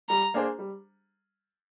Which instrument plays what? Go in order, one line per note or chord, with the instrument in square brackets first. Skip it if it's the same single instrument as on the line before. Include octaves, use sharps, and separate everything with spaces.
[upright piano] G3 [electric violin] A#5
[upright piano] A#3 D4 G#4 C5
G3